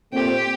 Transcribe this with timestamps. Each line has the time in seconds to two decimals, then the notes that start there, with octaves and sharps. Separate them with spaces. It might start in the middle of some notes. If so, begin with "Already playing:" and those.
0.12 A#2 A3 C4 G4